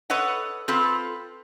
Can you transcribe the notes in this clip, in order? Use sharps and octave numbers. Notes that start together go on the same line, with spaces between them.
A4 B4 C#5 D#5 F#5
C4 F4 A4 B4